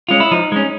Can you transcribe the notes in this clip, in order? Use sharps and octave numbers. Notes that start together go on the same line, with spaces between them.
G#3 C#4 F4
E4
F3 D#4
G#3 C#4